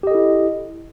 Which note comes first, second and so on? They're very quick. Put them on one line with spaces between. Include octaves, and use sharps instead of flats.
G4 D#5 A4 E4